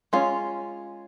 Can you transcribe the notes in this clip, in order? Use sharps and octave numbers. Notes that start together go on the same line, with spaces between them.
G#3 C#4 F4